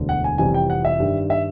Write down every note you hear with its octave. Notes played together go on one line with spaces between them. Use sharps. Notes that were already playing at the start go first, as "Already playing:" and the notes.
Already playing: E1 D2 D3
F#5
G#5
F1 F2 C3 E3 G3 G#5
G5
F#5
E5
G2 D#3 G3
E5